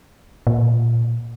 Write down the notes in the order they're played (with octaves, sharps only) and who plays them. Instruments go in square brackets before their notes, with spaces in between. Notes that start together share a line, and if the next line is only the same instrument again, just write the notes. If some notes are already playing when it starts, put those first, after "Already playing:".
[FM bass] A#2